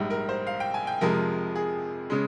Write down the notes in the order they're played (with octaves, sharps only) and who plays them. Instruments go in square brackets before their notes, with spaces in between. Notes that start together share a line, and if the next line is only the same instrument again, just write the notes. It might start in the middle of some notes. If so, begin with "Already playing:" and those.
Already playing: [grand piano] A#1 G#2 G3
A#4
C5
F5
G5
G#5
G5
F2 C3 F3 G#3 A#4
G#4
C#3 G#3